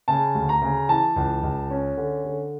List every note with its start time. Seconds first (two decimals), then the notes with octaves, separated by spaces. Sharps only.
0.08 C#3 A5
0.35 D2
0.49 A#5
0.62 C#3
0.89 E3 A5
1.16 C#2
1.43 C#2
1.70 C#4
1.97 D3
2.24 D3